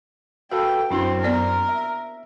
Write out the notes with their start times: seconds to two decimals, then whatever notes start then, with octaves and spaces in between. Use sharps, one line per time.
0.52 F#4 A4 B4 F5 G5
0.91 F#2 C4 D4 E4 F#4 C5 C6
1.22 A#3 B3 A#4 D5
1.69 E5